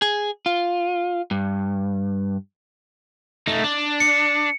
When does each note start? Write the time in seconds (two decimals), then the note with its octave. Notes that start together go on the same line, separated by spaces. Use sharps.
0.02 G#4
0.46 F4
1.31 G2
3.47 A3 D#4
3.64 D4
4.00 C#7